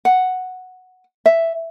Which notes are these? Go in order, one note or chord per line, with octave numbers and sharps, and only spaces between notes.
F#5
E5